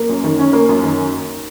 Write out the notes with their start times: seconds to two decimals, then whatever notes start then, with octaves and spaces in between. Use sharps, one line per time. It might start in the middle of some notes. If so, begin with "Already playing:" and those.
Already playing: A#3
0.09 F#2
0.24 D#3
0.39 C#4
0.53 A#3
0.69 F#2
0.83 D#3